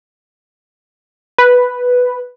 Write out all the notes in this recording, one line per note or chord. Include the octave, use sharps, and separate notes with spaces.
B4